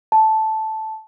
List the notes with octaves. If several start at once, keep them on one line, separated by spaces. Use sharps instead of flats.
A5